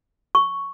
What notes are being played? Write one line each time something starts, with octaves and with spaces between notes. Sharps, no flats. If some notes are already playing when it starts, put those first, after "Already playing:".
C#6